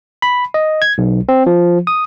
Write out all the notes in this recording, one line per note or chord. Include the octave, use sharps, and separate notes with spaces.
B5
D#5
G#6
B1
C4
F3
D#6